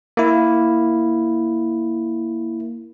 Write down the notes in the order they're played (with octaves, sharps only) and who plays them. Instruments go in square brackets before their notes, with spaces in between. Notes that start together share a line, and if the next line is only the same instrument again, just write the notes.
[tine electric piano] A#3 E4